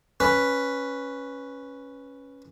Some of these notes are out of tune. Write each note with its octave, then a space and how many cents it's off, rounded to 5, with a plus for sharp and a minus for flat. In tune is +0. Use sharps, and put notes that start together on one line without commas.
C#4 +0 B4 +0